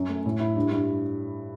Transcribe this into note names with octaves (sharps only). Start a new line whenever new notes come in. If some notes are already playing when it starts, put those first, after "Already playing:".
Already playing: F#2 C#4
A3
A2
E4
G2
G2